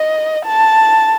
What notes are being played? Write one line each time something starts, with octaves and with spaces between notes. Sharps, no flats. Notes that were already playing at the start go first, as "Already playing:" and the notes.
Already playing: D#5
A5